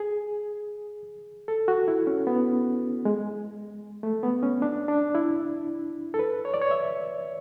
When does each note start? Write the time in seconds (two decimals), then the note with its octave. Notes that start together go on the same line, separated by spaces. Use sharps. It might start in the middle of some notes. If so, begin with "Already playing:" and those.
Already playing: G#4
1.48 A4
1.68 F#4
1.88 E4
2.07 C#4
2.27 B3
3.05 G#3
4.03 A3
4.23 B3
4.42 C#4
4.62 D4
4.88 D4
5.15 E4
6.14 A4
6.19 B4
6.45 C#5
6.54 D5
6.61 C#5
6.71 E5